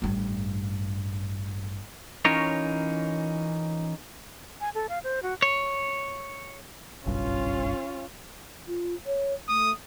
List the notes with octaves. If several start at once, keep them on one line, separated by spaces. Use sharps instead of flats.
A1 G2
E3 C#4 D#4 F4 A#4 C#5
G#5
A4
F5
C5
F#4
C#5
F#1 B1 G2 C#4 F4
F4
C#5
A3 D#6